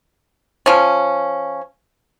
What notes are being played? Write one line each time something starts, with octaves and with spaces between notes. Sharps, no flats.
F3 C#4